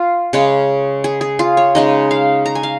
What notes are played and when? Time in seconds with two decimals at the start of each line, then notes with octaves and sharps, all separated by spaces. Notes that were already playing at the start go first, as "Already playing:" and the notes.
Already playing: F4
0.33 C#3 G#3 C#4
1.04 G#4
1.21 G#4
1.39 F4
1.57 C#5
1.75 C#3 G#3 D#4 D#5
2.11 F5
2.46 A#5
2.55 G#5
2.63 F5